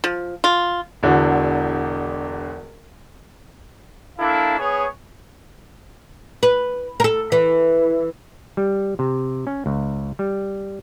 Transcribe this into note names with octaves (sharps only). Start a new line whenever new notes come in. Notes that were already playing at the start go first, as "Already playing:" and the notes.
F3
F4
E1 E2 D3 F#4
A#3 D4 E4 A4 F5
B3 G#4 C#5
B4
A4 A#4
E3
G3
C3
C#4
C#2
G3